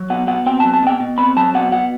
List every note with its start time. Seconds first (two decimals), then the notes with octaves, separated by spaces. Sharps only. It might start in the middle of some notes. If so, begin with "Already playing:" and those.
Already playing: F#3
0.10 B2 F#5
0.27 B2 F#5
0.46 C4 G5
0.60 A5
0.65 F#3
0.74 A5
0.83 B2 G5
1.00 B2
1.18 C4 B5
1.37 F#3 A5
1.54 B2 F#5
1.72 B2 F#5